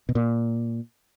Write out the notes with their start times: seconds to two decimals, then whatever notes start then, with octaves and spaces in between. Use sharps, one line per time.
0.09 B2
0.15 A#2